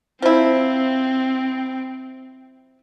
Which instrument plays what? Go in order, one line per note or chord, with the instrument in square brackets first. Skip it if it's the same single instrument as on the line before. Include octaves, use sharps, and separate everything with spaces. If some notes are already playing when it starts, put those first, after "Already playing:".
[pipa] F3 E4 [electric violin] C4